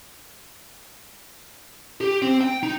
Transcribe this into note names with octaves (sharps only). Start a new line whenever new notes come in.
G4
C4
G5
D#4